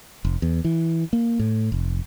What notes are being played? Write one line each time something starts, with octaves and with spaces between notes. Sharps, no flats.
F1
E2
E3
A#3
A2
F1